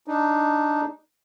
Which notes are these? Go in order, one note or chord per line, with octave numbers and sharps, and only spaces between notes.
D4 D#4